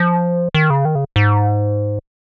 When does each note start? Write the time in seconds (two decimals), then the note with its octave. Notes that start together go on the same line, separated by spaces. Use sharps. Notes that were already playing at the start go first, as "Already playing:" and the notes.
Already playing: F3
0.54 D#3
0.70 C#3
0.85 D#3
0.95 C#3
1.16 G#2